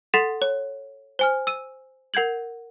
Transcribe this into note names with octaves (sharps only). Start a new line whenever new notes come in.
A4 F#5 C6 A6 B6 E7
C#5
C5 G#5 F6
E6 D#7
A#4 F#5 G6 G#6 F#7